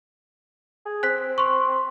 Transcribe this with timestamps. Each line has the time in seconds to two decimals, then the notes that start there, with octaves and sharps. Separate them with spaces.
0.86 G#4
1.03 C4 F#6 B6
1.38 C6 C#6